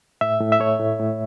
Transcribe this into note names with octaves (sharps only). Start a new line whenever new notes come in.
A2 E5
A2
E5
A3 C#5
A2
A2